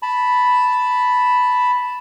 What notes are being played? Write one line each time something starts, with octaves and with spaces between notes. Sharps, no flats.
A5 B5